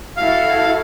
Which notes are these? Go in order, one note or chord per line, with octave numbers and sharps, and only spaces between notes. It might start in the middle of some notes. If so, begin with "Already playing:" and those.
E4 F#4 A4 F5